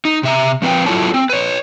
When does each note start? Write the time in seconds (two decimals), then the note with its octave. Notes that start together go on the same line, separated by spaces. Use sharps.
0.05 D#4
0.23 C3 E5 A#5
0.62 F3 C4 B4 F5 G5
0.86 F#3 E4 F4 A4 C#5 A5
1.14 C4
1.30 B4 C#5